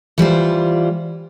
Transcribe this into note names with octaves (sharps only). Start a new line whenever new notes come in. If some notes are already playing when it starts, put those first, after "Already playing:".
E3 G3 F4 C5